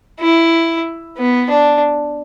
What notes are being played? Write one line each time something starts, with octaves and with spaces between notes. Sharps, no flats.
E4
B3
D4